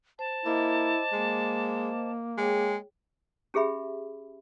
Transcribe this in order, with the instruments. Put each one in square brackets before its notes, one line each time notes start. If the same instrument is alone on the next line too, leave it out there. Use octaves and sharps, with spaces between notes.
[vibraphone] C5 [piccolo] A5
[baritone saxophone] A#3 [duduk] E4 [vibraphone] C5 D#5 D6
[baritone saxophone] G#3 [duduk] A#3
[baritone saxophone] G#3 [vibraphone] G#4 C#5 G5
[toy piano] C#4 G4 G#4 E5 B5